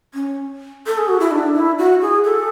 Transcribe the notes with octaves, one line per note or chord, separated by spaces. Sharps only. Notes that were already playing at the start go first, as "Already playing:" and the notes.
C#4
A4
G#4
F#4
E4
D4
E4
F#4
G#4
A4